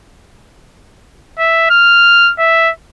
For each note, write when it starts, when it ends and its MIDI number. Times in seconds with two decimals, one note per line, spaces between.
1.39 1.70 76
1.70 2.32 89
2.39 2.71 76